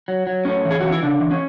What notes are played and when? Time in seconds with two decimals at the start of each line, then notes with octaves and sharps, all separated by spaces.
0.08 F#3
0.27 F#3
0.45 A2 C#4
0.65 E3
0.71 G#4
0.81 E3 F#4
0.92 E4
1.03 C#3 D4
1.21 E3
1.31 C#4